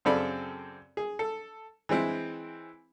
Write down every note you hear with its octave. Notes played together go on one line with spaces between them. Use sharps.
F#2 C#3 C4 A4 D5 B5
G#4
A4
E3 G#3 C4 E4